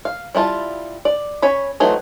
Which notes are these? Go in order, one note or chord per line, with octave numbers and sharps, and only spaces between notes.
F5
G3 E4 F4 A5
D5
C#4 C#5 B5
E3 F#3 A3 C4 D#4